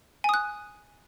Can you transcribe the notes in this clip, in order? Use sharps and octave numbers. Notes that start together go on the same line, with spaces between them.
G#5 D#6 F#6